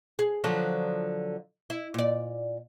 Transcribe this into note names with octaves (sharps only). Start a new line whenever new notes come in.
G#4
D3 F3 F#3
E4
A#2 D5